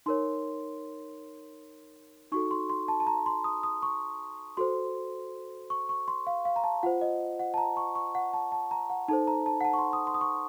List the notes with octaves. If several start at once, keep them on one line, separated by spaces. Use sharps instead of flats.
D#4 A#4 C#5 C6
D#4 F#4 A4 C#6
C6
C6
A5
A5
A#5
C6
D#6
D#6
C#6
F#4 A4 C5 C6
C#6
C#6
C6
F5
F5
A#5
A5
F4 C5 F#5
D#5
F#5
A5
A#5
C#6
C#6
F#5
A5
A5
A#5
F#5
D#4 A4 C5 A5
A#5
A5
F#5
A5
C#6
C6
D#6
C6
D#6
C#6